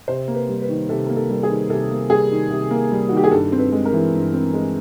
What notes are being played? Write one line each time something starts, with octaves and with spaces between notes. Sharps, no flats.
C3 C5
A#3
B4
G3
B4
D#3
C3 A4
A#3 A#4
A4
G3
G#4
D#3
C3 A4
A#3
G3 G#4
D#3
C3
A#3
G3
D#3 F#4
G4
G#4
G2 A4
C4
B4
G#3
A#4
E3
G2
C4
G#3